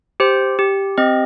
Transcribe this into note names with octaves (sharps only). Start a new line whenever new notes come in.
G4 C5
G4
C4 D#5